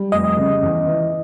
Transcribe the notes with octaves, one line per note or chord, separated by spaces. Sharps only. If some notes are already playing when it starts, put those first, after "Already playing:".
Already playing: G3
F1 D#5
C#3
E2
E3